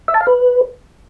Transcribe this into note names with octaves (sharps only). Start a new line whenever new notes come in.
E5
A5
F5
B4